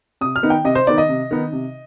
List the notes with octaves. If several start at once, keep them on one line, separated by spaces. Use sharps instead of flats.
C3 D#6
F6
D#3 B3 D#4
G5
C3 D#5
C5
D#3 B3 D#4 D5
D#5
C3
D#3 B3 D#4
C3